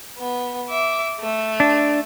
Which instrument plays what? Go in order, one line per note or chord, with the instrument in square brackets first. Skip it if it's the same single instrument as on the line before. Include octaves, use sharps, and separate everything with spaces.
[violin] B3
E5 D6
A3
[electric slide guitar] D4